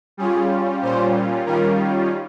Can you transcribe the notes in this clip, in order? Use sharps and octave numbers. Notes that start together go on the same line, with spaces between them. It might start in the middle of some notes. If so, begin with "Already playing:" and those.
G3 C#4 F4 G#4
A#2 G3 C#4 F4 C5
D#3 G3 C#4 F4 A#4